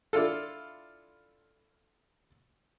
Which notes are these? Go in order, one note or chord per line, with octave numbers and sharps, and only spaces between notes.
D4 E4 F4 A4